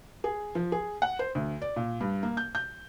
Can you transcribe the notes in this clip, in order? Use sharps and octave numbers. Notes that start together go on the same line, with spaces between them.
G#4
F3
G#4
F#5
C5
D2
D5
A#2
G2
A#3
G6
G6